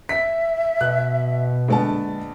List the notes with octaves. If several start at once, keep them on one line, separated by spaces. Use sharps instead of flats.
E5 B6
B2 F#6
A#1 D3 G#3 B3 A5